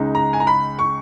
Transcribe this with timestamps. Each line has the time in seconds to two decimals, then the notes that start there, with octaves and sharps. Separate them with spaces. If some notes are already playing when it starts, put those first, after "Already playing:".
Already playing: C#2 C#3 G#3 D#4
0.15 A#5
0.33 G#5
0.40 A#5
0.47 B5
0.79 C#6